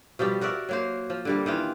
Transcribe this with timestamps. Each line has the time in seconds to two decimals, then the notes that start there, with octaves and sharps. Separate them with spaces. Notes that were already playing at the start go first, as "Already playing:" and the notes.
0.19 B2 F3 G3 G4
0.41 F#4 A#4 D5 E5
0.69 F#3 A#3 C5
1.10 F3
1.25 D3 G3 A#3
1.46 D#3 E3 F4